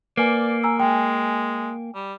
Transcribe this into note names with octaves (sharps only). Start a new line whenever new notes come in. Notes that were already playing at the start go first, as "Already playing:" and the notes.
A#3 B4 D5 G#5
G#5 A#5 E6
G#3 G5 G#5
G3